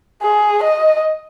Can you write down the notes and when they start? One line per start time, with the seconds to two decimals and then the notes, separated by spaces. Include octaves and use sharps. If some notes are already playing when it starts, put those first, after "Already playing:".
0.23 G#4
0.63 D#5